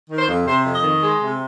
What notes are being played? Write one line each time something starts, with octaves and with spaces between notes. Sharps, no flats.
D#3
C5
F2
C3 C5
F2
D#5
D#3
G#3
C3